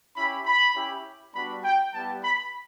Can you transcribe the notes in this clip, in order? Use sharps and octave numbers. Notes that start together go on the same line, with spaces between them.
C#4 E4 G4 B5
B5
C#4 E4 G4
G3 B3 D4 F#4 B5
G5
G3 B3 E4 G4 A5
B5